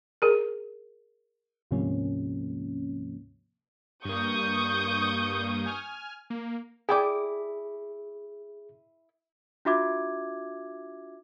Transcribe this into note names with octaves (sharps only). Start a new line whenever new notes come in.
G#4 A#4
D2 G#2 C3 F3 A#3 C#4
G2 A#3 C#6 D#6 G6
G#5 F6
A#3
E4 G#4 D5 G5 G#5 D6
D4 F4 F#4 E5 D6 G#6